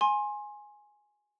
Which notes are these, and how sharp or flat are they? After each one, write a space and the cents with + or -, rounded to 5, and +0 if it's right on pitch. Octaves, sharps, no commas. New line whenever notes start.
G#5 +0 C6 +25